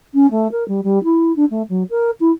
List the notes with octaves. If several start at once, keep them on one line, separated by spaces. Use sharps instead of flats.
C#4
A3
A#4
G3
G3
E4
D4
A3
F#3
A#4
E4